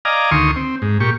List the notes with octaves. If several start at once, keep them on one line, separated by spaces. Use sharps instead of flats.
D5 D#5 F5 G#5 A#5
D2 D#3 C6 C#6 D#6
C4
G#2
A#2 G4 C#6